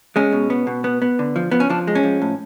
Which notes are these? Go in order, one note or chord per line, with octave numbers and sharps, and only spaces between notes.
G#3 C#4
B2
B3
B2
B3
B3
D3
F3
F3 B3
C#4
F3 D4
G#3
C#4
F3
A2